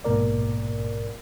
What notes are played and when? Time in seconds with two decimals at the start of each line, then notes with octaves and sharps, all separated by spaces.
0.04 A#1 G#2 B2 A#3 A#4 D5